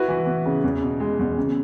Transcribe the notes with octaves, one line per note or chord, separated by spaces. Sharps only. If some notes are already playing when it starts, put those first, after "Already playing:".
Already playing: E4 F#4 B4
E3
B3
C#3
E2
B2
G#3
E2
C#3